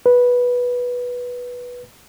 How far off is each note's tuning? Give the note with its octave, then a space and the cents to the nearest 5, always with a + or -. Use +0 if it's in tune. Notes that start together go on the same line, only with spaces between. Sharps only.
B4 -10